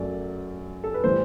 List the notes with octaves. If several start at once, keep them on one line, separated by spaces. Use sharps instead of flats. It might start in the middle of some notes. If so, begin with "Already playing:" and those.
Already playing: F#2 F#3 A3 D5
A4
B4
A2 E3 G3 C5